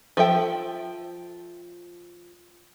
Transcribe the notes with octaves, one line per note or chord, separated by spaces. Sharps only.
F3 A4 E5 G5